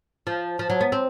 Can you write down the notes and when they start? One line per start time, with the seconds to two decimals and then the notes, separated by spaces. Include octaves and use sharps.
0.27 F3
0.59 F3
0.70 F#3
0.81 B3
0.92 C4